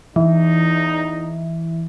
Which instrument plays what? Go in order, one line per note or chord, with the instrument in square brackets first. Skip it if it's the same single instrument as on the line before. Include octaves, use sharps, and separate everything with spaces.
[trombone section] E2 D#4 [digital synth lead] E3